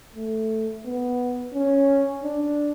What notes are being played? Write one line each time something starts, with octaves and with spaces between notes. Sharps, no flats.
A3
B3
C#4
D4